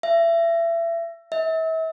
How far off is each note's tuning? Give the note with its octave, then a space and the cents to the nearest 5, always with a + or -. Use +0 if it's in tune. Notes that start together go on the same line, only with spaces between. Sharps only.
E5 +30
E5 -35